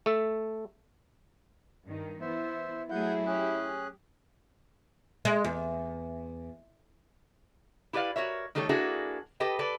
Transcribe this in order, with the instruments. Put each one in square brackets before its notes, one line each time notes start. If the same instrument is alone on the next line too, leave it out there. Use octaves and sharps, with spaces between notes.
[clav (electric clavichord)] A3 A4
[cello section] G2 D#3 D#4
[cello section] E3 B3 E4 [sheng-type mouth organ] C5 E5
[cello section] F#3 A3 G#4 [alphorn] E4 [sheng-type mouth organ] F#5 G6
[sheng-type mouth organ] C#4 G#4 F#6 [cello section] G4
[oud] G#3
E2
[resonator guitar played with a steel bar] E4 G4 B4 D5 F5
F#4 A#4 C#5 E5
D#3 G3 A3 A4 C#5
A#3 D4 E4 F#4 G#4 A4
G4 A4 B4 D#5 G5
A4 B4 D5